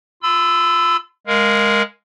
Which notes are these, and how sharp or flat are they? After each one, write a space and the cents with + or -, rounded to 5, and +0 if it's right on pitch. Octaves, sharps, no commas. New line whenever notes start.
F4 +0 B5 +45 E6 +0
G#3 +0 A#4 +0 F5 +0